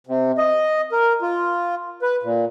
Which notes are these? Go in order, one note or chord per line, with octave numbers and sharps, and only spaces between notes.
C3
D#5
A#4
F4
B4
A#2